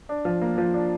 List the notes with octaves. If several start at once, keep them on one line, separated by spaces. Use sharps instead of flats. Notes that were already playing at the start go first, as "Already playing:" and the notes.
D4
F3
A#3
F3
D4